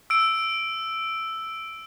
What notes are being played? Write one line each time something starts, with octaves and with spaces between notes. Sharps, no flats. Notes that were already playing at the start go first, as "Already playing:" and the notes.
E6 D7